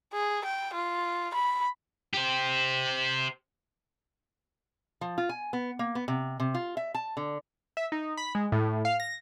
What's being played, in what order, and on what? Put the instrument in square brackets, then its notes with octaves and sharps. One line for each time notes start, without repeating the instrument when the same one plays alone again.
[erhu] G#4
G5
F4
B5
[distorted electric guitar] G4 C5
[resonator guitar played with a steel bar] F3
F4
G#5
B3
A#3
B3
C3
C3
F4
E5
A5
D3
[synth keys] E5
D#4
B5
G#3
A2
F5
A#6